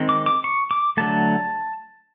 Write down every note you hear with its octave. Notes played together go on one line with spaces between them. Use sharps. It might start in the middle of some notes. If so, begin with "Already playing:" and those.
Already playing: D#3 G#3 C4
D6
D6
C#6
D6
D3 F#3 A3 A5